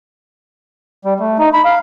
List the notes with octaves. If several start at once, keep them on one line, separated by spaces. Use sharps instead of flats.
G3
A3
D#4
B5
F5